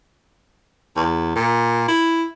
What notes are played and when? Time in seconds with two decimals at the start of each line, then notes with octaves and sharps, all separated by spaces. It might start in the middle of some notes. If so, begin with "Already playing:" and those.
0.96 E2
1.36 A#2
1.88 E4